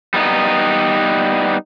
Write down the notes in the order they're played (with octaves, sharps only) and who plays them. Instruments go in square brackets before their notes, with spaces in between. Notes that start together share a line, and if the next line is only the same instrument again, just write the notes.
[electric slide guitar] G3 B3 D#4